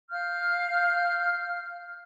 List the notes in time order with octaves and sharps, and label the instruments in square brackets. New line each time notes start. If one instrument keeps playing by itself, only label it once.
[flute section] F5 F6 G6